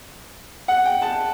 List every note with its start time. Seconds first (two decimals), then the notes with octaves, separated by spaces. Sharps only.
0.68 F#5
0.85 G5
1.02 A5